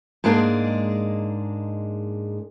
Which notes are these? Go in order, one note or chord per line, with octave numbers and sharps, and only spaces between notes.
G#2 G#3 A#3 D4 G#4